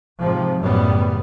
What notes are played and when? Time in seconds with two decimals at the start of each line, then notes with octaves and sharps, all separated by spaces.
0.21 G#2 C3 F3
0.62 F#2 A2 C#3 G3 B3